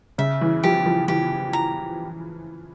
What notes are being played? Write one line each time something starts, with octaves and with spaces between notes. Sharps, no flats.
C#3 E5
E3
F3 G4
F3
E3 G4
A#5